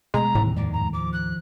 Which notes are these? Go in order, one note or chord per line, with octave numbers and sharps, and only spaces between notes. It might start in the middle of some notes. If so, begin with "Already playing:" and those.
B2 G#3 A3 A#5
D#2 A2 C3 E3 G3
F2 G#2 G#3 D5
A#5
F3 D6
F#6